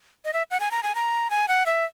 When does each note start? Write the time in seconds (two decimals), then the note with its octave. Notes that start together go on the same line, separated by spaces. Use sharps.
0.25 D#5
0.33 E5
0.51 F#5
0.60 G#5
0.71 A#5
0.83 G#5
0.95 A#5
1.30 G#5
1.48 F#5
1.66 E5